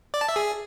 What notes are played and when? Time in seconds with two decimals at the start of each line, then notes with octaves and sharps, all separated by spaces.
0.14 D5
0.21 A5
0.29 E5
0.36 G#4